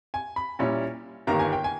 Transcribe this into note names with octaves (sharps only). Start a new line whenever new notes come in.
G#5
B5
A#2 G3 C#4 E4
G1 G2 D#3 A#3 A#5
G#5
G5
G#5